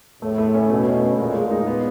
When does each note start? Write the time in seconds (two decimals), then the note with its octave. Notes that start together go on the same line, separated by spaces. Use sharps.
0.22 A2 A3
0.38 A3
0.54 C#4
0.70 B2 A3
0.86 C#4
1.02 A3
1.18 A#2 G#3
1.35 G#3
1.51 D#4
1.67 B3